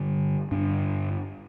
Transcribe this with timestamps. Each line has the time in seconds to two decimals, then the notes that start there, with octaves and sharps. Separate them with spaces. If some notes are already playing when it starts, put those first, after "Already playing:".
Already playing: G2 D3
0.51 G2 D3 D4